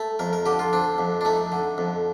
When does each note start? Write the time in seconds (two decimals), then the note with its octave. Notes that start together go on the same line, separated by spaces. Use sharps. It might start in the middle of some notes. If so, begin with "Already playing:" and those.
Already playing: A3
0.19 F2 A#4
0.33 A#4
0.46 D3 G4
0.59 F4
0.73 C4 D4
0.98 F2
1.21 D4
1.25 A3 D#4
1.52 D3
1.78 F2